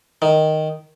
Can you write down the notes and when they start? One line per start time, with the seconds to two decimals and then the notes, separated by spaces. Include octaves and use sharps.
0.22 D#3